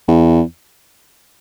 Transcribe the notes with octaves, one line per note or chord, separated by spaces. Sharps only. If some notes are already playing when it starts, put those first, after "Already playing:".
E2